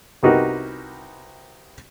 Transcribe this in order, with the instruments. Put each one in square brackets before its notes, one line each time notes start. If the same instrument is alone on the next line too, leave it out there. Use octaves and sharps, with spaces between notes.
[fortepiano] C2 B3 D#4 F#4 G4 A#4